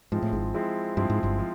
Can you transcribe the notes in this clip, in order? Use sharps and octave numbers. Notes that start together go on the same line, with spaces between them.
G#2 F3 G#3 C4 E4
A2
G#1 G#2
F3 G#3 C4 E4
G2 F3 G#3 C4 E4
G#2
G1 G2
F3